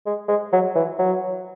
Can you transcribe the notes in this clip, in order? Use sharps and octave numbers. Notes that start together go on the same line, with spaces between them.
G#3
G#3
F#3
E3
F#3